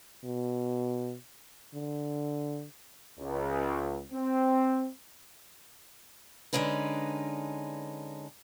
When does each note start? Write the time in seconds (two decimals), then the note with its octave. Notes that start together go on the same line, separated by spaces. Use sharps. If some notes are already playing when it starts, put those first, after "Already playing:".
0.24 B2
1.74 D3
3.19 C#2
4.12 C4
6.53 D3 G#3 C#4 D#4 B4